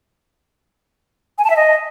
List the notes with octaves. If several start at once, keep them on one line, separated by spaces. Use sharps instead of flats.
G#5
A5
E5
D#5